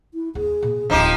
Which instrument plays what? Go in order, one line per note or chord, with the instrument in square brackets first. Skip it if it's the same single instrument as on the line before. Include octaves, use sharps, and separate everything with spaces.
[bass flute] E4
[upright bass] D#2 [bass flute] G#4
[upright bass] A#2
[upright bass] D1 D4 [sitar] F3 D#4 G4